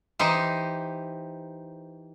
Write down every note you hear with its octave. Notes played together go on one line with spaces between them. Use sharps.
E3 D#4 G4 C5